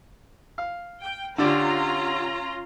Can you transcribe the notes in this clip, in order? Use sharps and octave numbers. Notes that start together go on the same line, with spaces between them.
F5
G5
D3 C#4 D4 F4 G4 A#5